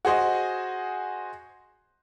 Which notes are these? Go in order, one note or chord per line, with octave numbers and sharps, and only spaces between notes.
F#4 G#4 C5 D#5